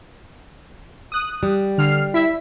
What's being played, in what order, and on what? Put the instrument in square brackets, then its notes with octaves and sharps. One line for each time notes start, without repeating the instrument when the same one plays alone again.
[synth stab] D#6 F#6
[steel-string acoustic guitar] G3
[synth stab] D3 F6 C7
E4 E5 B6